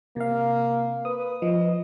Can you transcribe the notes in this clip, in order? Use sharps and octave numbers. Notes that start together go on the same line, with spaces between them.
C3 A#3 F5
B4 D#6
F3 D#5